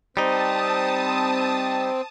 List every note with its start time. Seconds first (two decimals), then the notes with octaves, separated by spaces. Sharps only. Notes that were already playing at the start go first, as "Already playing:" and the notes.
0.17 G3 C4 D#4 A5 D#6